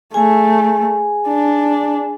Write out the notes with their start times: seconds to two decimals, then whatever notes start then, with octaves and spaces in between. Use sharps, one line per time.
0.14 A3 G#4 G#5
1.28 D4